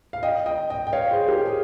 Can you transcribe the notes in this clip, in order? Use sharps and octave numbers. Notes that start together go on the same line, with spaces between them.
F5
D#5 G5
D#5 G5
D#5 G5
G5
C#5 F5
G#4 C5
G4 A#4
G#4